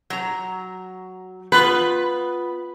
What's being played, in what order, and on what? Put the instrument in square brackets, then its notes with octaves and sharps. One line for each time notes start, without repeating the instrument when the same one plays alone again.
[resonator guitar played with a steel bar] F#3 A#5
[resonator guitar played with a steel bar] B3 F4 [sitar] B4